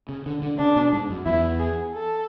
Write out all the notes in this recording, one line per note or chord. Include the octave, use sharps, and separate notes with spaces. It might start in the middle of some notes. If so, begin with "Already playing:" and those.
C#3
D3
D3
C#3 D4
B2
G#2
F#2
E2 E4
G#4
A4